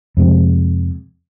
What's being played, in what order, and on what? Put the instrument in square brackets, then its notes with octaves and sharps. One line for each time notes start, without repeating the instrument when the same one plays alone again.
[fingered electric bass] F2 C3 G#3